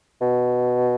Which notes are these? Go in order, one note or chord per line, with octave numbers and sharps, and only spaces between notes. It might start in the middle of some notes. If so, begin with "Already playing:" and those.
B2